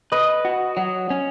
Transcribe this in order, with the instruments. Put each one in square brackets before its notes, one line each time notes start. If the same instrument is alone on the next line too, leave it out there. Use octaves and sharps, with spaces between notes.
[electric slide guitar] B4 [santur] D#5
[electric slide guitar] F#4
F#3
C#4